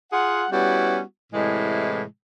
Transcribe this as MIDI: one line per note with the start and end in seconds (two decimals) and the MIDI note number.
0.12 0.46 65
0.12 0.46 68
0.12 0.46 78
0.51 1.01 55
0.51 1.01 59
0.51 1.01 61
0.51 1.01 64
0.51 1.01 66
1.33 2.03 45
1.33 2.03 48
1.33 2.03 52
1.33 2.03 56